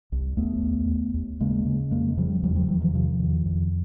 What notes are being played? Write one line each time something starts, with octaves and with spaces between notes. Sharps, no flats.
C2
D#2 A3 B3
D#2
D#2
D#2
C#3 G#3 A#3
C#3
F2 G#3 A#3
C#3 F3 G3
E2 F3 G3
F3 G3
E2 E3 F#3
D#3 F3
C3 D#3 F3
E2
F2